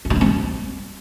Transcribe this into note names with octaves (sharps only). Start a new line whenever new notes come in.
E4
D#4
C#4
C4
G3